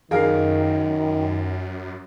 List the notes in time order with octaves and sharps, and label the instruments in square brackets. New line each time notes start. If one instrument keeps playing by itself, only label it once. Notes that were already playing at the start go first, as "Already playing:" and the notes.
[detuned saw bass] F#2 [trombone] D#3 [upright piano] G#4 A#4 F5